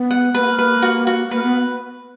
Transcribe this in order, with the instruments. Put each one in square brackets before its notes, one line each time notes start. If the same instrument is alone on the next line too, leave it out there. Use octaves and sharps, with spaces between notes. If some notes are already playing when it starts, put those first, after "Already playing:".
Already playing: [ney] B3
[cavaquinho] F#5
[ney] A#3 B3 [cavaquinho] B4
[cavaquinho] B4
F#4
F#4
[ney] A#3 [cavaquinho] B4
[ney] B3